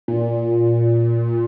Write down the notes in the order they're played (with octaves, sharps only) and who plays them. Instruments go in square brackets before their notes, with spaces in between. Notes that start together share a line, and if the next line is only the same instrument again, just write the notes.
[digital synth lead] A#2